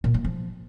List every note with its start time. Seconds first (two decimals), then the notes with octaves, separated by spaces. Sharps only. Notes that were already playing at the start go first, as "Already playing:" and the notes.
0.04 A#2
0.14 A#3
0.25 F3